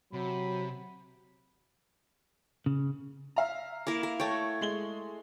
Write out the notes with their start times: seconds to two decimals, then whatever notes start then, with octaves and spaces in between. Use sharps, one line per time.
0.13 C3 F#3 B5
2.66 C#3
3.36 E5 F5 A#5
3.87 A#3 E4 A#4
4.03 A#4
4.20 A3 C#5 G5
4.61 G#3 F#7 G7